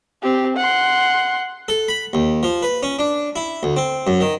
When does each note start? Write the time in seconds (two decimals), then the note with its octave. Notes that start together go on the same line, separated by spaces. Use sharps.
0.23 C4 G4
0.57 F#5 C6
1.68 A4
1.88 B5
2.13 D#2
2.43 F3
2.63 B4
2.83 C#4
2.99 D4
3.36 E4
3.63 D2
3.76 C4
4.07 F#2
4.21 D#3